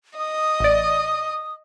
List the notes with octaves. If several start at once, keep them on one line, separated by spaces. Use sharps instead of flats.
D#5 D#6
A1 D5